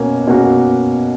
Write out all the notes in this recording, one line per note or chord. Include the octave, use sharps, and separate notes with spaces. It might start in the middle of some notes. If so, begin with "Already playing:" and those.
Already playing: B2 A#3 C#4 F#4
B2 A#3 C#4 F#4